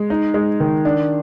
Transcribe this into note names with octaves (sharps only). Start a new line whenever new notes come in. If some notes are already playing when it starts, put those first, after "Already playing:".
Already playing: G#3
D#4
G#3
D#3
D4